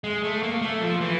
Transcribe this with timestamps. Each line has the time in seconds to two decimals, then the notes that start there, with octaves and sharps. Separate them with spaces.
0.04 G#3
0.24 A3
0.43 A#3
0.62 A3
0.81 F3
1.01 E3